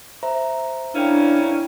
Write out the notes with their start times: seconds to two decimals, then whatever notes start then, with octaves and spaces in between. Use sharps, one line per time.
0.23 C5 E5 A#5
0.94 C#3 A#3 C#4 D4 E4 G5